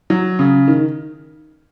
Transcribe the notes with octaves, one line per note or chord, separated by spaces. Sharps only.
F#3
C#3
D#3